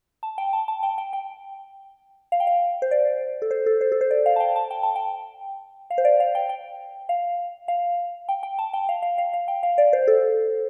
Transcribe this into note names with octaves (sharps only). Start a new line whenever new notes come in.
A5
G5
A5
A5
G5
G5
G5
F5
G5
F5
C5
D5
A4
C5
A4
C5
A4
C5
D5
F5
A5
G5
A5
G5
A5
G5
F5
C5
D5
F5
G5
G5
F5
F5
G5
G5
A5
G5
F5
F5
F5
F5
G5
F5
D5
C5
A4